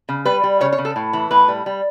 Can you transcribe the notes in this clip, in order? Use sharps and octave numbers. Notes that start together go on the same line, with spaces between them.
C#3
G3 B4
G3
C#3 C#5
C#5
C#3
A4
A2
E3
A2 B4
G3
G3